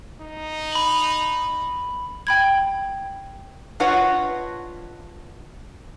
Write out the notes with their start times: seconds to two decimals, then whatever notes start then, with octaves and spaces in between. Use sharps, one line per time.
0.21 D#4
0.72 B5 F#7
2.27 G5 B5 G#6
3.80 D4 F4 B4 C#5 D#5 F#5